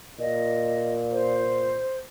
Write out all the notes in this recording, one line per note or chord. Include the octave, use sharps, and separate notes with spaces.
A#2 D#5
C5